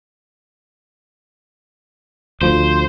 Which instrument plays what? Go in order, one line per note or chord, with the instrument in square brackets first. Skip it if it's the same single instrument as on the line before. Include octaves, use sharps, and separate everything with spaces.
[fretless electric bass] D2 F3 [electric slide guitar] C5